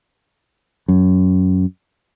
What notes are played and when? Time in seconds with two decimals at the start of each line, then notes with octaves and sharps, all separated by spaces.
0.88 F#2